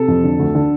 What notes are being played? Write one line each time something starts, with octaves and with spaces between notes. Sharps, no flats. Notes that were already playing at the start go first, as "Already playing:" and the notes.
Already playing: C3 A4
F2
D3
D2
D3